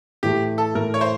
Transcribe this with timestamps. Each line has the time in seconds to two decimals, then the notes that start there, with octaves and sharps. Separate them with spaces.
0.23 A2 E3 A3 G4
0.58 A4
0.75 A2 E3 A3 A#4
0.94 C#5
1.01 C5